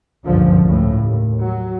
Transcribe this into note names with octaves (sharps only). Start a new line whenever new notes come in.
F#1 C#2 G2 A#2 D3 F3
C#2 A2 C#3
D#2
F#3